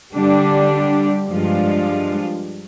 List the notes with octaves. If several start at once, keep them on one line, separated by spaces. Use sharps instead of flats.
D3 G3 D4 G4
G2 F3 G#3 D4 F4